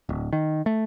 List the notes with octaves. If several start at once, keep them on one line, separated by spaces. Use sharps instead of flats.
D1
D#3
A3